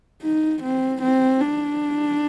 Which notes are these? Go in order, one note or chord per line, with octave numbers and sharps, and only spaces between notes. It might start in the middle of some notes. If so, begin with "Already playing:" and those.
D#4
C4
C4
D4